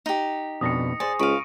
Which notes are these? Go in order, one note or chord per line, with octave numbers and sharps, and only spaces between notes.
D#4 G4
F2 B2 D4 D#6 A#6 C#7
G#4 C5 D5 G#5
C#2 F5 B5 C#6 D7 D#7